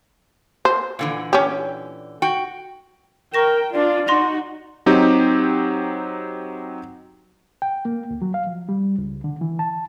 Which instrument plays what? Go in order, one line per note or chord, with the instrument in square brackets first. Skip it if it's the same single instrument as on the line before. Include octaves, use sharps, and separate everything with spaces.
[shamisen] C5
[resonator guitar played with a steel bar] A#2 D3 E3
[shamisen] C#4 G4
[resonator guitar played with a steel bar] F#4 G5
[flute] A#4 [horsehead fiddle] G5 [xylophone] C#6 A#6 E7
[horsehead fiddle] D4 F4 [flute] D5
[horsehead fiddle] D#4 F#4 [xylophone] C6 A#6 F7
[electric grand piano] F#3 C4 D#4 G4
[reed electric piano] G5
A#3
D2
F#3
F5
F3
G3
C#2
D3
E3
A5